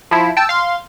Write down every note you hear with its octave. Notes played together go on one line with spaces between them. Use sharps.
F3 E4
G5 A5 E6
F5 C6